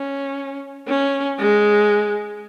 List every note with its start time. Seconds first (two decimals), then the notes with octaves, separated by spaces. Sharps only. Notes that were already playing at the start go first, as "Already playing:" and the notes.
Already playing: C#4
0.88 C#4
1.39 G#3